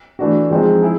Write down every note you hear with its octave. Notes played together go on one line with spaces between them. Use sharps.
E3 A3 D4 F#4
F3 G#3 C4 D#4 G#4
E4 G#4